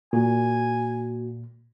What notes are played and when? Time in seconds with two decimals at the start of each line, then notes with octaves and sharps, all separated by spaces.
0.13 A#2 A#3 F#4 G#5